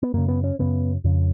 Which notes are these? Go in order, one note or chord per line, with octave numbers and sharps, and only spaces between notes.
B3
F#2 C#3 A#3
B3
C#4
F#2 C#3 B3
F2 C#3